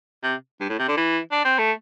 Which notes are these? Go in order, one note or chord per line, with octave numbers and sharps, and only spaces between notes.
C3
G2
A2
C3
D3
E3
D4
C4
A3